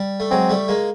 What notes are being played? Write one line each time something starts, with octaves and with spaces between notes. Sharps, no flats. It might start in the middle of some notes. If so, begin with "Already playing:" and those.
Already playing: G3
A3
F#3 G#3 C4
G3 A3
G#3 A#3